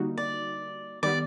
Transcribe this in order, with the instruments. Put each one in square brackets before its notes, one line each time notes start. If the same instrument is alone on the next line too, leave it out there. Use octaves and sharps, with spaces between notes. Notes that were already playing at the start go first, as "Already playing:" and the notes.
Already playing: [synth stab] D3 G3 A#3 D#4 F#4
[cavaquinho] D5
[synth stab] D#3 G3 B3 [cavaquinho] D5